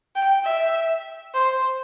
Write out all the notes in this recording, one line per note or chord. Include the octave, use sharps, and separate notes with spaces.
G5
E5
C5